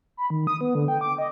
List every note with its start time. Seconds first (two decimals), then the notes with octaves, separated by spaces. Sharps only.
0.17 B5
0.30 D#3
0.47 D#6
0.61 B3
0.75 D3
0.88 G5
1.01 D6
1.18 D#5